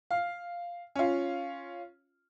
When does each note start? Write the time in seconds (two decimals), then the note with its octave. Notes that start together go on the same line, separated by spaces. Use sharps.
0.11 F5
0.95 C#4 F4